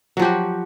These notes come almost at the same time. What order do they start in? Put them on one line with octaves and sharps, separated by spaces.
F#3 F3 G4 F#4